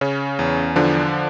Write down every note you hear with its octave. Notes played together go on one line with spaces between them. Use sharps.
C#3 C#4
E2
D3 F3 D4